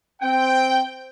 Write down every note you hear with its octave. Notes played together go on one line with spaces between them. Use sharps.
C4 G5